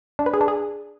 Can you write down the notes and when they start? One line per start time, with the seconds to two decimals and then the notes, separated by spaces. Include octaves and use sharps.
0.19 D4
0.26 B4
0.34 G#4
0.41 D4
0.48 G#4